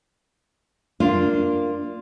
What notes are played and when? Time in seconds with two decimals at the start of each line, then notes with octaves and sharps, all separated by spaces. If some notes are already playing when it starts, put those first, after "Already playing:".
1.00 A#3 D4 F4